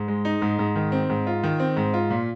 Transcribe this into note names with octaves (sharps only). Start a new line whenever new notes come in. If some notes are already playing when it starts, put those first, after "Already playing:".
Already playing: G#2
G#3
D#4
G#2
G#2
D#3
C4
G#2
F4
D#3
C4
G#2
F4
A#2